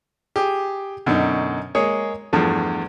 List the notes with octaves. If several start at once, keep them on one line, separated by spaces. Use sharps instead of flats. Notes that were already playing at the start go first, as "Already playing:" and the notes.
G4 G#4
F#2 B2 D3 D#4
G#3 A#3 G#4 C#5
E2 G2 F3 A3